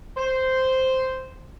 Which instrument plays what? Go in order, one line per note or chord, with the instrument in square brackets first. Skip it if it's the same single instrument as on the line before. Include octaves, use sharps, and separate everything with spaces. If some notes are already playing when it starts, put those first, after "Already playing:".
[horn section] C5